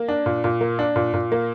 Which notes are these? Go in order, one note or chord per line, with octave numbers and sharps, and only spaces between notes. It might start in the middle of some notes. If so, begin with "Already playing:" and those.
Already playing: A#3
D4
A#2
A#2
A#3
D4
A#2
A#2
A#3